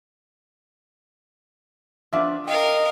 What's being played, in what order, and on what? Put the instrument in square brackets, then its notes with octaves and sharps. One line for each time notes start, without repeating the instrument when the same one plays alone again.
[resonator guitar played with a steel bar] F3 B3 D4 [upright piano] E5
[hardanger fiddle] A#4 F5 [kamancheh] D#5 [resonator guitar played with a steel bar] G5